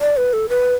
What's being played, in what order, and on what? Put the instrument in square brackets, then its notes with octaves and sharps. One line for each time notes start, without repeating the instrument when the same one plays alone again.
[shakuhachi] D5
B4
A4
B4